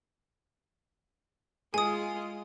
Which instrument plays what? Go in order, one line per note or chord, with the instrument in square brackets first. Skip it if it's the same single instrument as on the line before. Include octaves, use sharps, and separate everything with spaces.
[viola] G#3 F4 [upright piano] G#4 [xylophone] G#5 D#6